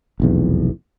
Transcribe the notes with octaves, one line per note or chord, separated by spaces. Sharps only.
F1 B1 E2